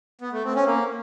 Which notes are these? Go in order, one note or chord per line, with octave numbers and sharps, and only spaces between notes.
B3
A3
C4
C#4
A#3